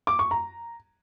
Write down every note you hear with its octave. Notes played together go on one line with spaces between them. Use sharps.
D6
C#6
A#5